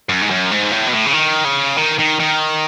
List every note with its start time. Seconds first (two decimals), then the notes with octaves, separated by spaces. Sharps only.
0.09 F#2
0.21 G#2
0.30 F#2
0.51 G#2
0.72 A2
0.87 B2
0.93 A2
1.06 C#3
1.13 D#3
1.45 C#3
1.77 D#3
1.99 D#3
2.20 D#3